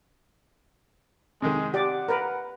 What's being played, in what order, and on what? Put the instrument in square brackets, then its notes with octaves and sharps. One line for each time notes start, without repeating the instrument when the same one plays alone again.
[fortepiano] C3 D#3 [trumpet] G#3
[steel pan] G4 D5 [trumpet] F#5
[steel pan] A#4 B4